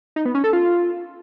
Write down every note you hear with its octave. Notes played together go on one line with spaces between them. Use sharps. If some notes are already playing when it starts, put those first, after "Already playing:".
D#4
B3
C#4
A4
F4